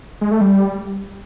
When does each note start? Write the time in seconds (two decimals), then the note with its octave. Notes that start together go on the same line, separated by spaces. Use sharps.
0.21 G#3
0.31 A3
0.41 G3